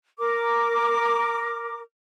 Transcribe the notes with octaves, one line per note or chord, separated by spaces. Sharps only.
A#4 D6